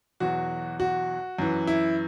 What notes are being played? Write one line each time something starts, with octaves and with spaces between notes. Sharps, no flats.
E2 B2 F#3 F#4
F#4
F#2 E3
E4